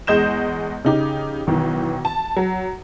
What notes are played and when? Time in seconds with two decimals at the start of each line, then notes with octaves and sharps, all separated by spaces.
0.07 E2 G#3 D#5 G6 E7
0.84 C#3 D#4 G4
1.47 B1 D#3 E3
2.05 A5
2.36 F#3